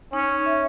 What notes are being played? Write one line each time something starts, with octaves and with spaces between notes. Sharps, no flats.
C#4 D#4
C#5
E5